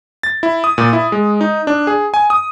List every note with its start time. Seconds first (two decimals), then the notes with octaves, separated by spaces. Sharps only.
0.23 A6
0.43 E4
0.64 D#6
0.78 A#2
0.93 E4
1.12 G#3
1.41 D#4
1.67 D4
1.87 G#4
2.14 G#5
2.30 D#6